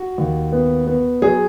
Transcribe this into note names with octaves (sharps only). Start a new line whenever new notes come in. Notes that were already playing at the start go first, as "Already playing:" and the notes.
Already playing: F#4
D#2
B3
B3
F#3 G#4